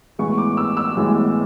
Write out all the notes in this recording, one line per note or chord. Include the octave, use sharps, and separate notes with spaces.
A2 E3 G#3 B3 C#6
D6
E6
E6
A2 E3 G#3 B3